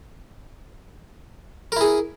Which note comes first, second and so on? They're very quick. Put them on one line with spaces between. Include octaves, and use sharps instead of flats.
A#4 E4 G#4